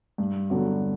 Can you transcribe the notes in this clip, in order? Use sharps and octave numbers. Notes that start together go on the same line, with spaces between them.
G2
D3 F#3 B3 F#4